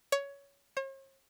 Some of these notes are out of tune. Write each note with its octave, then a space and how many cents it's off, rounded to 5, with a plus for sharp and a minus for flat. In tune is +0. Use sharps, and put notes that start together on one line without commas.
C#5 +15
C#5 -45